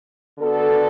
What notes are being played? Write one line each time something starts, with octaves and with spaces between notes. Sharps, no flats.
D3 B3 F#4 A4 D5